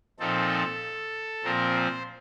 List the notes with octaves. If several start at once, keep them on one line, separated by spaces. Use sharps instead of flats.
A#2 F3 C4 D#4 A4
A#2 F3 C4 A#4
C5